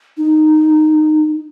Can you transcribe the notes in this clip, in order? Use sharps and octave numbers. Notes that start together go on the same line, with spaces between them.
D#4